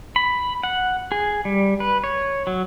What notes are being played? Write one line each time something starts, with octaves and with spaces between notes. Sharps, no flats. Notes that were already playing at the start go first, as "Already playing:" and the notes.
B5
F#5
G#4
G3
B4
C#5
F#3